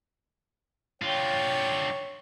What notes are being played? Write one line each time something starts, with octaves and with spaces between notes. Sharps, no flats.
D3 F4 C#5 G5